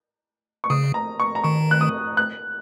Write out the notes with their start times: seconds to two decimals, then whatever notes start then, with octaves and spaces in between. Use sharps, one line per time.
0.64 C#6
0.70 C#3 D#6
0.94 A#5
1.20 C#6
1.35 A#5
1.44 D#3 C#6
1.71 F#6
1.81 D#6
2.17 F#6